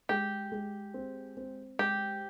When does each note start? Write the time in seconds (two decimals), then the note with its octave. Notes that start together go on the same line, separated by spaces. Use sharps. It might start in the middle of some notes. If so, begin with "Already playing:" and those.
0.09 G#3 G4
0.52 G#3
0.94 C4
1.37 C4
1.79 G#3 G4